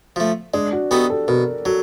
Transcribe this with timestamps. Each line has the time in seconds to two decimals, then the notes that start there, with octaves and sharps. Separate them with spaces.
0.16 F3 A3
0.54 G#3 D4
0.72 F#4
0.91 B3 D#4 F#4 G4 A4
1.10 A4
1.28 B2 A#4
1.65 F#3 A4